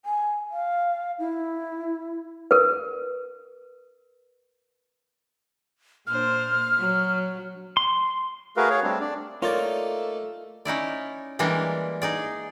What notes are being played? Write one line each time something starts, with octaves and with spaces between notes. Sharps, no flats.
G#5
F5
E4
A#4 B4
A#2 D4 C5 F6
F#3
C6
A3 F#4 G#4 A#4 B4 F5
G#4 C#5 F5
G3 A3 C4 D4
D4 D5
A3 A#3 D#4 F4 C#5 D5
C#4 D#4 E4 D5
E3 G3 G#3 A#3 D4
D#4 G#4 D5